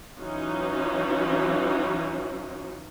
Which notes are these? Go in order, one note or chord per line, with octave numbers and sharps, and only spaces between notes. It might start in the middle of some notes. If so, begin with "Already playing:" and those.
E3 F#3 C#4 D#4 F4 F#4